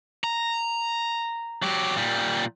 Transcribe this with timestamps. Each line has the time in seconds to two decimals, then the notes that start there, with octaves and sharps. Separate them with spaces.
0.24 A#5
1.62 F#3 G4
1.97 A#2 G3